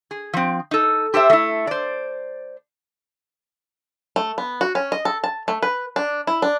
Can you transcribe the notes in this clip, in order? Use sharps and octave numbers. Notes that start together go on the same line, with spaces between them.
G#4
F3 C4
D#4 A4
G4 A4 C5 E5
A3 E4
C5 D5
A3
B3
F#4
C#4
D#5
A4
A5
A3
B4
D4
E4
D4